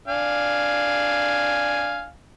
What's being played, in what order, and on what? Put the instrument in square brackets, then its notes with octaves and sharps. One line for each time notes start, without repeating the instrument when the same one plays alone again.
[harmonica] D4 F5 G#5